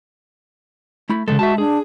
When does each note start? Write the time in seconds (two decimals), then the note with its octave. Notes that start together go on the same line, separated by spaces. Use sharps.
1.10 A3 E4 B5
1.28 C#3 E3 G#3 A4
1.39 F#4 E5 A5
1.58 D4 G#4